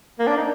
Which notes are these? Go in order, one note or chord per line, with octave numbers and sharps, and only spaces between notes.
A#3
D4
D#4